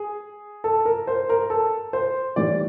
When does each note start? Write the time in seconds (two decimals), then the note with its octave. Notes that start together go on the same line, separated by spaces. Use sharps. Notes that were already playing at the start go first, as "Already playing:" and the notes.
Already playing: G#4
0.64 A4
0.85 A#4
1.07 C5
1.29 A#4
1.50 A4
1.93 C5
2.36 A2 E3 G3 D5